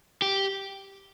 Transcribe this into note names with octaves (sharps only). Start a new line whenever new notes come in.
G4